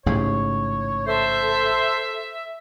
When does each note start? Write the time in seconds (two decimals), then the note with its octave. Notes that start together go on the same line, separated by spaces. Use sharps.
0.06 A1 G#2 C#3 C#5
1.07 A4 C5 E5